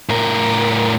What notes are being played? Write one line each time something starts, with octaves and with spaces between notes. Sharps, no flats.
A2 A#4